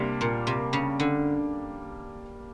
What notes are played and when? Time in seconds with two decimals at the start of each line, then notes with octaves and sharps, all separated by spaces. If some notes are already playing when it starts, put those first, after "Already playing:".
Already playing: C3 G3 A#3 D4
0.21 A#2
0.47 C3
0.73 C#3
1.00 D3